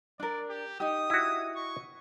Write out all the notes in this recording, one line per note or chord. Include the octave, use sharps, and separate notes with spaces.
D4 A#4 D5
G4
D#4 G4 D#6
E4 F#4
C#6